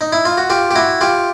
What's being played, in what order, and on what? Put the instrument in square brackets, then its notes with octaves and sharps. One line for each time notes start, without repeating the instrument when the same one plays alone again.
[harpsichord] D#4
E4
F4
F#4
F4 G4
G4
E4 F#4
F4 G4